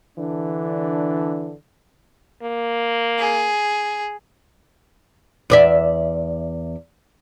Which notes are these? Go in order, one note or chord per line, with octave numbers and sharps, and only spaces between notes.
D3 E3 D4
A#3
G#4
E2 D5 E5